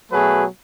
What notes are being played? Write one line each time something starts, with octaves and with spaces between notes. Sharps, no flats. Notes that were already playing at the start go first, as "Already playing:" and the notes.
B2 F#3 A3 G#4 B4